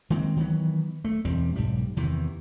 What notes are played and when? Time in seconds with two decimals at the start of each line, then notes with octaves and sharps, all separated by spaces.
0.10 D#3 G#3 A#3 C4
0.37 D#3 E3 F#3 B3
1.05 A3
1.25 E1 E2 G3 C4
1.56 B1 G#2 G3
1.97 E2 C3 D#3 E3